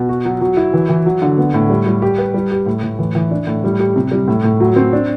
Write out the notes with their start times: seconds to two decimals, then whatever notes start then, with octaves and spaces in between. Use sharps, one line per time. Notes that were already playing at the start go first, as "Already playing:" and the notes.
Already playing: B2
0.09 F#4
0.25 F#3
0.41 F#3
0.57 E4
0.74 E3
0.89 E3
1.06 F#3
1.22 D3
1.38 B3
1.54 A2
1.70 G3
1.87 G3
2.02 G4
2.18 B4
2.34 G3
2.51 G4
2.66 A2
2.83 A2
2.99 E3
3.15 E3
3.31 D4
3.47 A2
3.64 G3
3.80 G4
3.96 C3
4.11 G3
4.28 A2
4.44 A2
4.60 F#3
4.76 C4
4.93 D4